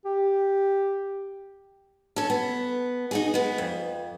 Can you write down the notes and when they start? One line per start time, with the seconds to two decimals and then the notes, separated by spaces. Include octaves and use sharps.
0.05 G4
2.16 C#4 A4
2.30 B3
3.11 D#4 F#4 G#4
3.34 G#3 B3
3.58 F2